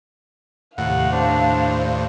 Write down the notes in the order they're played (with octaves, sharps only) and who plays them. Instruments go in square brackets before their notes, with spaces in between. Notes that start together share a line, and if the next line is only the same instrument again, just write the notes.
[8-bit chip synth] D#2 A2 [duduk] C3 [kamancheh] F5 [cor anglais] F#5
[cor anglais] D4 [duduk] C5